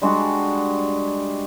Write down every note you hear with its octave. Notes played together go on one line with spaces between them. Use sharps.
G3 G#3 D4 F#4